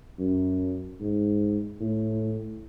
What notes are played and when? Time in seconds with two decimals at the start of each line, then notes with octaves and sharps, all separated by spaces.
0.19 F#2
1.00 G#2
1.80 A2